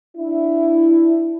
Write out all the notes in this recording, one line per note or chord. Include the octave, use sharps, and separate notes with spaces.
D4 E4